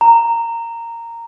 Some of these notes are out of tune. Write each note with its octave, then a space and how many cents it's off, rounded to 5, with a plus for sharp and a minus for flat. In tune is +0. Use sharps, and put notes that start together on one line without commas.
A#5 -10